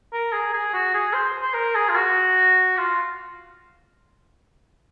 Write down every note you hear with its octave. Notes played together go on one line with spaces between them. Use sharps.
A#4
G#4
G#4
F#4
G#4
C5
C5
A#4
G#4
F4
F#4
F4